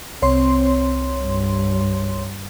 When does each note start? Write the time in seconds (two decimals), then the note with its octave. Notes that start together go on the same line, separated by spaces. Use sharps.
0.22 C2 C4 C#5 C6
1.23 G2